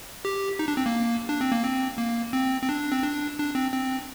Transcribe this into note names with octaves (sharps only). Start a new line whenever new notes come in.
G4
D#4
D4
C4
A#3
D4
C4
A#3
C4
A#3
C4
C4
D4
C4
D4
D4
C4
C4